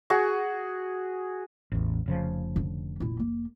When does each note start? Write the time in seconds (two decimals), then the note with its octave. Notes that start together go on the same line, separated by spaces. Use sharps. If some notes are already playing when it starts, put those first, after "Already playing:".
0.10 F#4 G#4
1.72 A1 E2
2.06 F1 C#3 F3
2.56 D3
3.00 A#2 E4
3.20 A#3